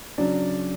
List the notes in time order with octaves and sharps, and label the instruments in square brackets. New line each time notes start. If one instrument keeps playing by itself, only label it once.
[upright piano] C#3 F#3 D4 D5